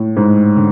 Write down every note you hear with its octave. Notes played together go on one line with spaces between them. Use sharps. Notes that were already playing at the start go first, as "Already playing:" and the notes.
Already playing: A2
G#2
D3